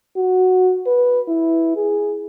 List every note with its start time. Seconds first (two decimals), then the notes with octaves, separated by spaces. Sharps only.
0.16 F#4
0.87 B4
1.28 E4
1.76 G#4